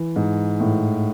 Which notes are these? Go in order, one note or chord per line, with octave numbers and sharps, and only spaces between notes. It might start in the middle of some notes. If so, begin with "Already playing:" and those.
Already playing: E3
G#2
A2